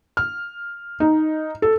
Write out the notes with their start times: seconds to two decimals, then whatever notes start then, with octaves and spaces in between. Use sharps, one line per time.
0.17 F6
1.00 D#4
1.62 A4